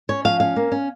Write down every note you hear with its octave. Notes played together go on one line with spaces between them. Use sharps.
C#4 C#5
F3 F5
C#4 F5
A#3
C#4